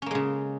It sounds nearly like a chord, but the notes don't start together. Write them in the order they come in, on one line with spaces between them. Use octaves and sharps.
C#4 A#3 G#3 C#3